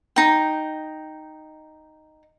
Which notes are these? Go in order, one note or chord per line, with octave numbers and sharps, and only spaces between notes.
D#4 G5